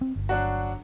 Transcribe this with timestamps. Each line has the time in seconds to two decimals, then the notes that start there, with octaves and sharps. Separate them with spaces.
0.01 C4
0.16 G1
0.29 F#3 D4 F#4